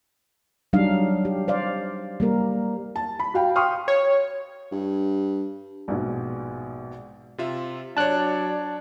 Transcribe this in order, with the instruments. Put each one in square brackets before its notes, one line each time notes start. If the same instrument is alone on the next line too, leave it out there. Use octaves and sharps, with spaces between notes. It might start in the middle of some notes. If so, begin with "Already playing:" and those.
[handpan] F#3 G3 D4 D#4 F5
G4
C5 D5 F5
G3 A#3 A#4
[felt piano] A5
B5
F#4 F5 G5
F5 G5 C6 C#6 D#6 F6
[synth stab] C#5
[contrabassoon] G2
[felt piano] A#1 G#2 B2
[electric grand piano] C3 F4 E5
[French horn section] F#3 D5 [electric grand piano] D4 C#5 [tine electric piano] A5 F#6